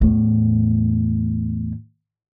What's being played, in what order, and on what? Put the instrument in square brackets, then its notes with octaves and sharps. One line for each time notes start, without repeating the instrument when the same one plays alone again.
[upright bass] E2 A2